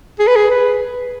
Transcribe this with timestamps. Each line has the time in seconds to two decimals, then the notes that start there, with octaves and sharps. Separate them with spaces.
0.19 G#4
0.27 B4
0.36 G#4
0.50 B4